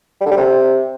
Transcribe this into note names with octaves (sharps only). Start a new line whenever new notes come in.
G3
D3
G3
C3